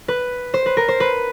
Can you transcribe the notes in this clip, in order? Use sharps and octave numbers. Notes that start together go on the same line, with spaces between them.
B4
C5
B4
A#4
C5
B4